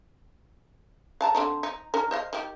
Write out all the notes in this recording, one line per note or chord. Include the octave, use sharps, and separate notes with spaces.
F5 A5 A#5
D3 C4 D#4
D#4
D#3 C#4 A#4
C5 D#5 F5
D#3 G4